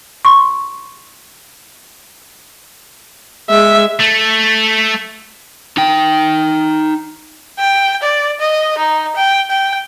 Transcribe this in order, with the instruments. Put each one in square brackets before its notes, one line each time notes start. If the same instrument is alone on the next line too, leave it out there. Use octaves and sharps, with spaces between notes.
[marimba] C6 C#6
[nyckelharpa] G#3 [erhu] E5
[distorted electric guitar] A3
[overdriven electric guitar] D#4 G5
[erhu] G5
D5
D#5
D#4
G5
G5